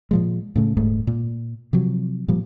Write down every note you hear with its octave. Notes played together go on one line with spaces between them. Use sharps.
A#2 F3 G#3
A2 C#3 A3
D#1 G#2 A3
A#2
C3 F3 F#3
A#2 F3 G3